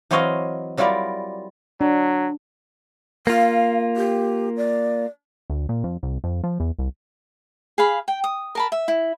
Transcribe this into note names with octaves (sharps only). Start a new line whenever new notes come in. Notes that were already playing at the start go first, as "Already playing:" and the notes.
E3 F#3 C4 C#5 D#5 F5
F#3 G3 E4 F4 A#4 D5
F#3 D4
A#3 F4 F5
G4
D5
D2
A#2
F2
C2
F2
F3
E2
C2
G#4 F5 B5
G5
D#6
A#4 A5 B5
E5
E4